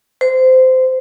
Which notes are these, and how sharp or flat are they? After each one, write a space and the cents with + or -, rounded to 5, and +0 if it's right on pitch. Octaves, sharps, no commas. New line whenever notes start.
C5 -20